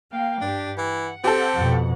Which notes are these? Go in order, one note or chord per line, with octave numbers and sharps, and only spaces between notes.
A#3 F5 G5
G2 D4 G4
E3 F#5
C4 G4 A4
F2 B2